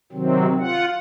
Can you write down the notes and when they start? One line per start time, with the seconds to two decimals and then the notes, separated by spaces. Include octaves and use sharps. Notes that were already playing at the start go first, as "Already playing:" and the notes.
0.12 C3 D#3 F#3 C4
0.60 F4 F#5